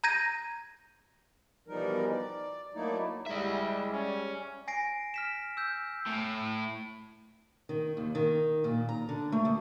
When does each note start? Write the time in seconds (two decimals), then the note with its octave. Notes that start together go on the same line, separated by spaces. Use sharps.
0.04 A#5 G6 G#6 A#6 D#7
1.68 B2 E3 F3 G3 D#4 A#4
2.10 D5
2.74 F#3 A3 A#3 D#4 E4 D5
3.26 G3 G#3 E4 D5 E5
3.91 C#4
4.68 G#5 A#6 C7 D7
5.14 F6 B6 E7
5.57 E6 G6
6.06 A2
7.69 D#3
7.97 D#2
8.15 D#3
8.64 A#2
8.89 A#5
9.09 D3
9.32 A3
9.45 D2